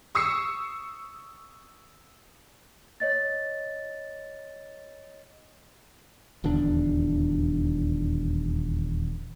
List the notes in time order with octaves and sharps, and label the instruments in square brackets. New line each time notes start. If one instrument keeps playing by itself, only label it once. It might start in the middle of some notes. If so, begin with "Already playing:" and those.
[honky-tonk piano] C#6 D#6 E6 C7 C#7
[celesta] C#5 D#5 A6
[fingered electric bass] D#1 E2 D3 D4